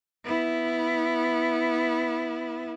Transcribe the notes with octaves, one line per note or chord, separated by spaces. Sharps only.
B3 E4